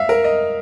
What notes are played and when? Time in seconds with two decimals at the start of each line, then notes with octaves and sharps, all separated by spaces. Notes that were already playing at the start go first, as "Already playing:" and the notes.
Already playing: E5 F5
0.09 A#4
0.24 D#5